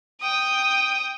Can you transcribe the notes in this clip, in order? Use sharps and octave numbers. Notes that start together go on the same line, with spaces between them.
G5 D#6